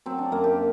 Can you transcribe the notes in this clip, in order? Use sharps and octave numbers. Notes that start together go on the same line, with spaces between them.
F#3 C4
D4
F#2 A#3
G4